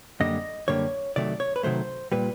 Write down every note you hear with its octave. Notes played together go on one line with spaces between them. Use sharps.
F#2 D3 G3 A#3 D#5
F#2 D3 G3 A#3 C#5
C3 D#3 F#3 A3 D5
C#5
B4
C3 D#3 F#3 A3 C5
A#2 G3 B4